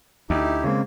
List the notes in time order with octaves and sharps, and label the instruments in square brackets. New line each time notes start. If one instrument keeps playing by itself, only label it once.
[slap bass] D2 [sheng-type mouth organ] D#4 E4 G4
[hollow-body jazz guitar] C#3 G#3 C4 [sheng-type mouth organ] A#3